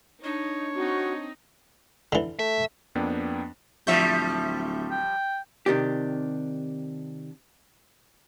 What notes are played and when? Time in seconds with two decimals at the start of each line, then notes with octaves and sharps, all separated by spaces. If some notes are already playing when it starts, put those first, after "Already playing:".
0.24 D4 D#4 C#5
0.76 C4 D#4 F#4
2.12 D3 E3
2.39 A3 E5
2.95 F2 A#3 B3 D4 G5
3.87 D1 F3 G3 E5 C#6 G6
4.91 G5
5.66 C3 D#3 D4 G4